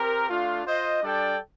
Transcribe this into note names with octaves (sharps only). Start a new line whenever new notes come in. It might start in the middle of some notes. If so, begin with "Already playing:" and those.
Already playing: C4 G4 A#4
A3 D4 F4
F4 C5 D#5
G3 D4 A4 D5 G5